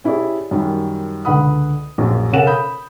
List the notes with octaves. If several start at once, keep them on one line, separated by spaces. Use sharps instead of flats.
C#4 E4 G4 G#4 D5
F#2 D#3 G3
C#2 D3 B4 F#5 B5 D#6
A#1 F#2
C#3 C#4 A4 A#4 F#5 E7
B5 D#6 G6